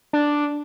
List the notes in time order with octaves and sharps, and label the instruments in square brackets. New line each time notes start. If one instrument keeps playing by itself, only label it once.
[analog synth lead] D4